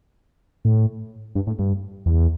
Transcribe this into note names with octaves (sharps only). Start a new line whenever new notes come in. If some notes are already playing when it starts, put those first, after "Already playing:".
A2
G2
A2
G2
E2